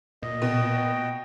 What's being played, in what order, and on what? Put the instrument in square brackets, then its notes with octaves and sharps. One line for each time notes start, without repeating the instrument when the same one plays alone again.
[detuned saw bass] A#2 [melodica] D#5
[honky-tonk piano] B2 [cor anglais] G5